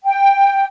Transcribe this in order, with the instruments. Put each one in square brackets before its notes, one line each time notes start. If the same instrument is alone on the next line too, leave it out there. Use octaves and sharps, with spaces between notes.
[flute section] G5